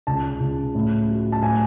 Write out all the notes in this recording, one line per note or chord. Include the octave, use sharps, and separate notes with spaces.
C#2 A5
C#2
A2
F#3
A5
A2 G#5